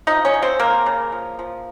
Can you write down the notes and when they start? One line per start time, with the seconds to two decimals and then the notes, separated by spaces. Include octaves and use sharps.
0.07 F3 D#4 D#5
0.25 C#4 C#5
0.34 F3
0.42 C4 C5
0.60 C#3 A#3 A#4
0.86 C#3
1.12 F3
1.39 F3